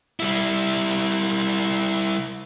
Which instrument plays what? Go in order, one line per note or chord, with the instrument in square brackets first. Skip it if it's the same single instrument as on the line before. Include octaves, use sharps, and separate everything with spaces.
[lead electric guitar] G3 E4